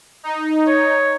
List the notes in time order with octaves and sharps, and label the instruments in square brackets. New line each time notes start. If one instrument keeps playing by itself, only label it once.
[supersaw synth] D#4
[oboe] C#5